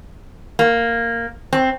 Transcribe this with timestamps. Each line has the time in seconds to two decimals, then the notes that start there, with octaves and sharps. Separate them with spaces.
0.59 A#3
1.53 C4